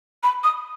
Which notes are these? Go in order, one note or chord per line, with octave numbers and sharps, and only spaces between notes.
B5
D#6